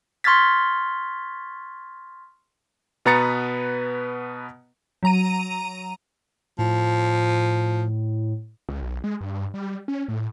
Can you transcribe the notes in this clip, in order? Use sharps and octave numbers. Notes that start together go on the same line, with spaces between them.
C6 C#6 F6 G#6 A6 B6
B2 B3 B4 A#5 A6 C#7
F#3 A#5 D#7
A2 F3
C#2
B1
G#3
G2
G3
C#4
A2